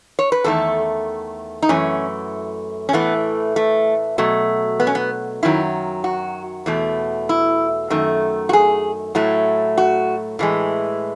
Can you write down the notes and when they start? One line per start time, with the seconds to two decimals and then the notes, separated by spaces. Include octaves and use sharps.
0.19 C#5
0.32 B4
0.44 E2 D#3 A3 A4
1.63 D#4
1.69 F#2 E3 A3 C#4
2.89 C#4
2.93 A2 E3 A3 B3
3.56 A3
4.18 B2 F#3 A3
4.80 B3
4.87 C#4
4.95 B3
5.43 F#2 D#3 F#3 E4
6.04 F#4
6.66 E2 B2 A3
7.29 E4
7.90 F#2 D#3 A3
8.49 F#4
8.53 G#4
9.15 A2 F#3 A3
9.77 F#4
10.39 A2 E3 G#3